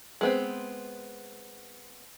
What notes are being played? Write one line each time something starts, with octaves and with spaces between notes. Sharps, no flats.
G#3 B3 C4